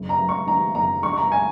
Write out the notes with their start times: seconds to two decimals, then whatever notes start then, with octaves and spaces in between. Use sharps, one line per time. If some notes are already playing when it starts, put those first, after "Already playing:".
Already playing: F#1
0.09 A#5
0.19 F#2
0.29 C#6
0.47 D#3 A#5
0.75 F#1 A#5
1.03 A#1 C#6
1.13 C#6
1.18 A#5
1.32 G#5